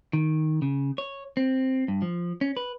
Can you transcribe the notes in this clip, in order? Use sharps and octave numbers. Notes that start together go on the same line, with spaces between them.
D#3
C#3
C#5
C4
G2
F3
C#4
B4